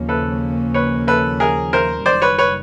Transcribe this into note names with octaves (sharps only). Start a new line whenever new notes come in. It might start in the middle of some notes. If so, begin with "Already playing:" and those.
Already playing: D#2 C#3 F3 A#3 C#4
A4 B4
B4 C#5
A4 B4
G#4 A#4
A#4 C5
F#1 F#2 D#3 G3 C5 D5
B4 C#5
B4 C#5